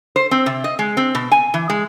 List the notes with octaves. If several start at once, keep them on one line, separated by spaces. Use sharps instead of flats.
C5
C4
C3
D#5
G#3
C4
B2
G#5
E3
G#3